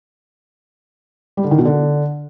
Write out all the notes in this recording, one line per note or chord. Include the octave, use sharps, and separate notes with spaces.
G3
D3
D#3
B2
D3